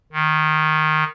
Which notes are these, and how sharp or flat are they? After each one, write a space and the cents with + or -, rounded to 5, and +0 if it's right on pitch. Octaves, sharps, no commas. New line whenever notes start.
D#3 -5